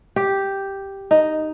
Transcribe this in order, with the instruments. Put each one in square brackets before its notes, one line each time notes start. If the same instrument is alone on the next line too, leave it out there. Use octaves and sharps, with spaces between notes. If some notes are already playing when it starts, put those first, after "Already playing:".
[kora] G4
D#4